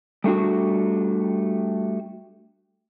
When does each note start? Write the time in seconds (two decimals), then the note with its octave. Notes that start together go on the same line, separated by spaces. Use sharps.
0.24 G3 A3 D4 F#4